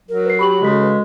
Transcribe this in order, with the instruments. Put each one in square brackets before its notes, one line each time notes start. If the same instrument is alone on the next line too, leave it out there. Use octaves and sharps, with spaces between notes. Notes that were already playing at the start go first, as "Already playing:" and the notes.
[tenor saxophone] F#3 [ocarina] A#4
[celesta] B4 C7
[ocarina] G4 [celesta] B5 C#6 F#7
[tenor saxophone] C#3 [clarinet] G#3 [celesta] F#4 A4 B6
[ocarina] B4